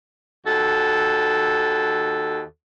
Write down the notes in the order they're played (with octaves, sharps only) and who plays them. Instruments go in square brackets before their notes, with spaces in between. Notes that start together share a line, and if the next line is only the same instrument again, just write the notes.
[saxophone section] D#2 F#4 A4